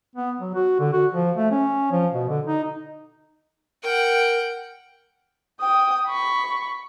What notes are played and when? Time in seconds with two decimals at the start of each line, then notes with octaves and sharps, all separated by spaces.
0.16 B3
0.40 F#3
0.55 F#4
0.80 D3
0.93 F#4
1.12 F3
1.36 A3
1.51 C#4
1.92 F3
2.13 B2
2.29 D3
2.46 D#4
3.83 A#4 F#5 G5
5.61 G5 D#6
6.08 B5 C#6